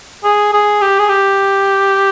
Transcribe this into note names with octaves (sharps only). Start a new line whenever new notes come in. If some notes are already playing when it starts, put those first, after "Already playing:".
G#4
G#4
G4
G#4
G4